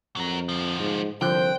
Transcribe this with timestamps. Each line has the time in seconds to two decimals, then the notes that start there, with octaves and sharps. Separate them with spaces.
0.16 F2 F#3 A#4
0.49 D2 F3
0.79 G#2
1.21 C2 D3 F3 C5 G5 F#6